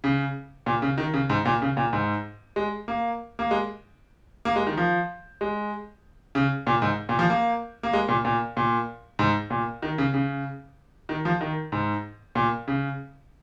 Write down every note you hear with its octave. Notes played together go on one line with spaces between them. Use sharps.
C#3
A#2
C#3
D#3
C#3
G#2
A#2
C#3
A#2
G#2
G#3
A#3
A#3
G#3
A#3
G#3
D#3
F3
G#3
C#3
A#2
G#2
A#2
F3
A#3
A#3
G#3
A#2
A#2
A#2
G#2
A#2
D#3
C#3
C#3
D#3
F3
D#3
G#2
A#2
C#3